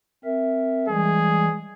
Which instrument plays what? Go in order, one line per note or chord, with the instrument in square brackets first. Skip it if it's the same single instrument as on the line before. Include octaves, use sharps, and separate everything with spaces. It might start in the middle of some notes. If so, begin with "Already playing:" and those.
[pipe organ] C4 A#4 E5
[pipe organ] E3 G3 G#3 [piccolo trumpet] G#4